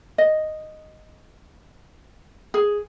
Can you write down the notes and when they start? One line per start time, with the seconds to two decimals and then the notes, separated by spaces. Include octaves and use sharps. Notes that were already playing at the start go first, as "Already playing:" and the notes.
0.18 D#5
2.54 G#4